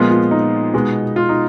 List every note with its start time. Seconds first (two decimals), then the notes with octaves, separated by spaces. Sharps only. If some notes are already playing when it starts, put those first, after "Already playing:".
Already playing: A#2 F3 G#3 B3 F4
0.11 F4
0.31 D#4
0.74 B2 G#3 B3
1.16 F4
1.29 D#4